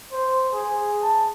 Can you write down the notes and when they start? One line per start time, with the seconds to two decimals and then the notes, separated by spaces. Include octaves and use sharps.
0.12 C5
0.52 G#4
1.02 A5